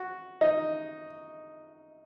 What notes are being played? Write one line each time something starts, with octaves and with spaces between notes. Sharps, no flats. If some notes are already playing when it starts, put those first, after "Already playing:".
Already playing: F#4
D#4